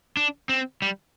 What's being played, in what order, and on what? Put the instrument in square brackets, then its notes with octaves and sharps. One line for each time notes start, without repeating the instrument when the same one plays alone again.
[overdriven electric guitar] D4
C4
G3